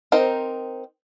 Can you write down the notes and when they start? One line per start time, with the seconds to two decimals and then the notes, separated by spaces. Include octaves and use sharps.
0.12 C4 D#4 A#4 C5